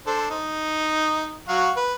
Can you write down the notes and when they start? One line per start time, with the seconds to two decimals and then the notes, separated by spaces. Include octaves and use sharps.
0.07 D4 A4 C5
0.30 D#4
1.48 F#3 F#4 F5
1.76 B4